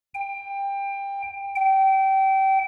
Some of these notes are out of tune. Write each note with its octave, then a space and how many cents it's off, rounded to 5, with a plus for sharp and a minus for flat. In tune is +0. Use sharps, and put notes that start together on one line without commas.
G5 +20
G5 -25